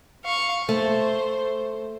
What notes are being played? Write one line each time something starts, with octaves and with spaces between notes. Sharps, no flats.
F5 C#6
A3 C5